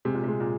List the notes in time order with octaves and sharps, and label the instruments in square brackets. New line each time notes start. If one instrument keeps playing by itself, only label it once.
[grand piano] C3 [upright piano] G#3
[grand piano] A#2
[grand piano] C3 [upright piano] G#3
[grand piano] A#2